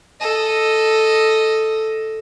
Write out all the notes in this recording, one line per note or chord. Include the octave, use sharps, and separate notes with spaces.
A4 D#5